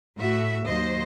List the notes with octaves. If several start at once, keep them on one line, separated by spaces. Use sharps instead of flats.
A2 A3 F#4 E5
D#2 F#3 C5 D#5